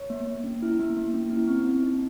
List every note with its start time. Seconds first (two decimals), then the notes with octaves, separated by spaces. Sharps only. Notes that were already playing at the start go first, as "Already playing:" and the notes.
Already playing: C#5
0.10 A#3
0.27 A#3
0.44 C#4
0.62 E4
0.79 A#3
0.97 A#3
1.14 C#4
1.30 E4
1.48 C4
1.65 C4
1.82 D#4